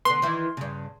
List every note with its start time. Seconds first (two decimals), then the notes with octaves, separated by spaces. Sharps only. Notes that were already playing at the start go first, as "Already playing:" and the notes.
0.05 D3 B3 C6
0.22 D#3 E3 E4
0.57 G2 C#3